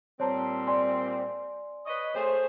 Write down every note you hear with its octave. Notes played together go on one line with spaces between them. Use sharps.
A#2 G3 C4 C#5 A5 A#5
D5 G#5 C6
B4 C#5 D#5
A3 G#4 C5 C#5